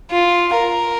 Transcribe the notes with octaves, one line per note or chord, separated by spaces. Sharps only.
F4
A#4